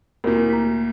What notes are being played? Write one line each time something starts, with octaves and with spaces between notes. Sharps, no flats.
D2 A#2 E4 G4 A#4
A#5 B6